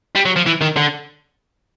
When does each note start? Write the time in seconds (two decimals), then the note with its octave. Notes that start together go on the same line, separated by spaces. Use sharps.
0.15 G3
0.25 F#3
0.36 F3
0.46 E3
0.61 D#3
0.76 D3